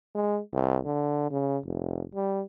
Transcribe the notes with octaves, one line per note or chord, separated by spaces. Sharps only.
G#3
C2
D3
C#3
F1
G3